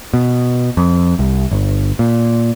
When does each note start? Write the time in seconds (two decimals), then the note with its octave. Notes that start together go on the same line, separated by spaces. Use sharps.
0.14 B2
0.77 F2
1.19 C2
1.51 G1
1.99 A#2